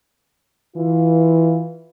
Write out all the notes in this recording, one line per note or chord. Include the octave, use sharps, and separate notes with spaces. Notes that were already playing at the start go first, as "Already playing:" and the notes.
E3 F4